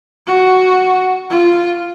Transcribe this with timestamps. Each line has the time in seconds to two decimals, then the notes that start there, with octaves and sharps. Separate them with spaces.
0.27 F#4
1.30 F4